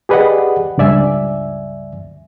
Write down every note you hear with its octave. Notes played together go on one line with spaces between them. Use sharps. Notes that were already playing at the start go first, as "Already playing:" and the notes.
G4 G#4 B4 D5 D#5 F#5
C#2 G2 D5 E5 G#5